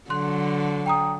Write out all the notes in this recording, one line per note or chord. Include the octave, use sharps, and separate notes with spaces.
D3 F#3 C6 F#6
G5 A#5 D#6